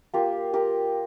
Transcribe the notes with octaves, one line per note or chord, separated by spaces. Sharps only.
A#3 F4 G4 A#4
G4 A#4